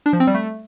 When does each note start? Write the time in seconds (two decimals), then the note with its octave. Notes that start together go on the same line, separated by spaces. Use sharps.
0.06 D4
0.13 F3
0.20 C4
0.27 G3
0.34 A3